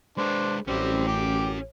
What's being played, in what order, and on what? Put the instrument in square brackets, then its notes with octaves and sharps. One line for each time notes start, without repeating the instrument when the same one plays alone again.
[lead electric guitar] G#3 B4 [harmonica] D4 C5
[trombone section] A1 [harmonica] G3 C4 [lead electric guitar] C#4 F#4
[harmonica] G5 D6